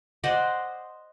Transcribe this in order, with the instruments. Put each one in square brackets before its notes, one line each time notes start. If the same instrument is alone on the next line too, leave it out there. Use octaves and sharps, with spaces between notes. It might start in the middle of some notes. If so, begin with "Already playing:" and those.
[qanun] C5 D5 D#5 F#5